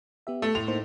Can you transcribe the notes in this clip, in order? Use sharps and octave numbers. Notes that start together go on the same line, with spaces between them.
B3 G4 E5
A3
A2 C6 F7
A#3 D#4 C5